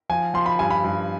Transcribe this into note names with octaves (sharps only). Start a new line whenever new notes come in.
F3 G#5
F3 C6
B5
G2 G#5
B5
G2